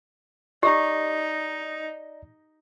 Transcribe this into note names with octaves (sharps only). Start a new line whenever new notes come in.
D#4 G4 D5 D#5 A#5